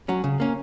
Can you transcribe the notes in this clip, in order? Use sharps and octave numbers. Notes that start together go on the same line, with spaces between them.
F#3 C#4
C#3
A#3 C#4